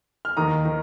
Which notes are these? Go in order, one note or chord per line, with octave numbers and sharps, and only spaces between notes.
F6
D#2 D#3 A#5 D#6
D#3